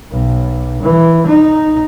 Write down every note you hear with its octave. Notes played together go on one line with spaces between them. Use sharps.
B1
E3
D#4